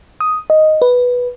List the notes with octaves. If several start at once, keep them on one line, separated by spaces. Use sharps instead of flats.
D#6
D#5
B4